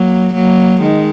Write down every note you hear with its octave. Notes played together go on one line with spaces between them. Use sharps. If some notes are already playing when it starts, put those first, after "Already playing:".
Already playing: F#3 A#3
F#3 A#3
D#3 G#3